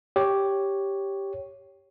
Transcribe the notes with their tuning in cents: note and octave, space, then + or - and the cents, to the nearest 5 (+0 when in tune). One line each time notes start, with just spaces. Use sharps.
G4 +0 C#5 +0